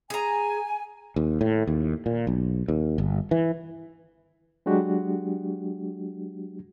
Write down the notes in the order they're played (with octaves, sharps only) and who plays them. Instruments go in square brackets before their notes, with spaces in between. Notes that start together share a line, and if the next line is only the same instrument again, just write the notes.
[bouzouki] G#4 A#5 [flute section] G#5
[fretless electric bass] D#2
A2
D#2
A#2
B1
D#2
G1
E3
[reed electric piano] F#3 G#3 D4 F#4 G4